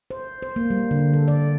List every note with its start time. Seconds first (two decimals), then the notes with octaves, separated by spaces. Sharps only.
0.10 C5
0.42 C5
0.56 A#3
0.70 G3
0.91 D3
1.14 A4
1.28 D5